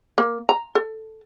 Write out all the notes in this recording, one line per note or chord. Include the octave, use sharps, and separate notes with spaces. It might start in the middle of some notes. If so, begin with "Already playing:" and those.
A#3
A#5
A4